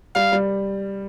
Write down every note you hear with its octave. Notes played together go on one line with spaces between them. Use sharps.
G3 F5
G3